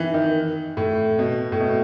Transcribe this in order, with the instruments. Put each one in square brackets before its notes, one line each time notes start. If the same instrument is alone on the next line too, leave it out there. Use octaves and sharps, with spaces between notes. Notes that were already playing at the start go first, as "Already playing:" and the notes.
Already playing: [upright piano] D#3 E3
D#3
A2
B2
A2
B2